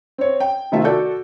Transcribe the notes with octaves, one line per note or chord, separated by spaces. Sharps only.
C4 C#5
G5
C3 D#3 A3 F4 E5
F#4 A4 D5 G6